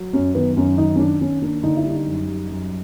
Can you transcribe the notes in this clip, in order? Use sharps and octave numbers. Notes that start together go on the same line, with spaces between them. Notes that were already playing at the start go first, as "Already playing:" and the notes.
Already playing: F#3
F#2 C#4
D#3 B3
F#2 C#4
D#3 D#4
C#4
D#3 D4
D#3 C#4
A#3 D4
D3 D#4
E4
G3
D#4
F#2
G3
F#2